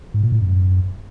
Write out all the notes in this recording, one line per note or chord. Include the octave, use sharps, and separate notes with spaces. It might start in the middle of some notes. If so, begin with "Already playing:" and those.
G#2
A#2
A2
F#2